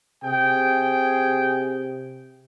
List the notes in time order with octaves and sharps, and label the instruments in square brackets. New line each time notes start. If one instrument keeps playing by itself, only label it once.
[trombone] C3 [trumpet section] G#4 G5